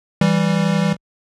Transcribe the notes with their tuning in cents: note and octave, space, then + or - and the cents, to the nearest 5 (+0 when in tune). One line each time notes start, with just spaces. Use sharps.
E3 +0 G3 +0